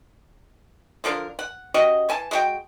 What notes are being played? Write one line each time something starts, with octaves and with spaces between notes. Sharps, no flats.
D3 F3 D4 A#4
F#5
C#4 F#4 G4 D#5
E3 G#5 A5
G#3 A3 F#4 G5